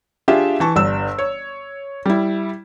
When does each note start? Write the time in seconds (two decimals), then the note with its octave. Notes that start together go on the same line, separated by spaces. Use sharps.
0.28 D4 F4 G4 G#4 E5
0.60 E3 A5 C#6
0.76 G1 G2 E6
1.18 C#5
2.06 G3 E4